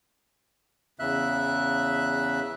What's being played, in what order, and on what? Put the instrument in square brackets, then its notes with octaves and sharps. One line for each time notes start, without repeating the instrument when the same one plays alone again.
[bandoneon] E2 C#3 E5 F#6